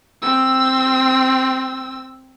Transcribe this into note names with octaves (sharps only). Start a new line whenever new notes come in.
C4 E6